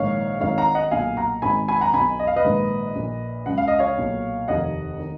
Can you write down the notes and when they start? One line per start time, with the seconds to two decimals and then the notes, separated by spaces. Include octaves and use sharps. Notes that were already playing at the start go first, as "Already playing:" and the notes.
Already playing: A#1 G#2 D#3 C#5 F5
0.40 G#1 G#2 D#3 C#5 F5
0.58 F#5 A#5
0.75 D#5 F#5
0.91 B1 A#2 F5 G#5
1.17 F#5 A#5
1.42 G#1 G#2 D#3 G#5 B5
1.68 G#5 B5
1.81 F#5 A#5
1.93 B1 B2 G#5 B5
2.19 D#5
2.27 F5
2.36 B4 D#5
2.45 A#1 G#2 D#3
2.96 A#1 A#2
3.46 C#2 C#3 F#5
3.58 F5
3.68 D#5
3.79 C#5 F5
3.98 B1 A#2
4.48 F1 D#2 D#3 D#5 F#5
5.00 D#3